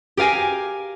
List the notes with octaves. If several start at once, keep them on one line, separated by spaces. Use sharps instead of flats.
G4 A#4 F5 G#5